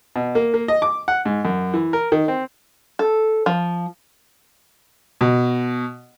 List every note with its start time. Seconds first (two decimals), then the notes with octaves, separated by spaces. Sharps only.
0.16 B2
0.35 A#3
0.54 A#3
0.68 D#5
0.82 D6
1.08 F#5
1.26 G#2
1.45 F#2
1.73 E3
1.93 A#4
2.12 D#3
2.28 C4
2.99 A4
3.46 F3
5.21 B2